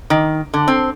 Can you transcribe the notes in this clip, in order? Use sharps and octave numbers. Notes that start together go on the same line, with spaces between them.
D#3
D3
C4